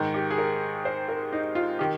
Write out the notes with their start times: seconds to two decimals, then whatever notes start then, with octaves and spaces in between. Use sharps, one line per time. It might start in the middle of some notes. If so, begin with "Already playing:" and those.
Already playing: G#2 D#3
0.14 G4
0.30 G#4
0.38 A#4
0.85 C5
1.08 A#4
1.33 D#4
1.55 F4
1.79 D#3 G4